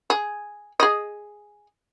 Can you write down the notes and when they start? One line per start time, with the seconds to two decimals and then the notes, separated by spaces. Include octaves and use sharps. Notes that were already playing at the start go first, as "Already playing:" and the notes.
0.10 G#4
0.80 G#4 D#5